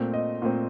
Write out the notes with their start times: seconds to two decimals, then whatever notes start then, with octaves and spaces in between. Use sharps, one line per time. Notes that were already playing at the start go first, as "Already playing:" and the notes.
Already playing: A#2 A3 C4
0.14 D#5
0.42 A#2 A3 C4